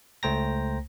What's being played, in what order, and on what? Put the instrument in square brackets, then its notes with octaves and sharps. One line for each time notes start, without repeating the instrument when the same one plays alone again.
[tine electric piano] C#2 A3 C5 G5 A#5 A#6